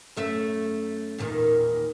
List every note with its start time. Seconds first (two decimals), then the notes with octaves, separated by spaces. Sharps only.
0.17 F#2 A3 E5
1.18 E2 A#2 D#3